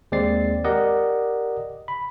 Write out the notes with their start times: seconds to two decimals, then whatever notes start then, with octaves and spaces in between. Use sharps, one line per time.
0.12 D#2 G#3 C4 D5 A6 C7
0.64 G4 A#4 D5 D#5 F#5
1.88 B5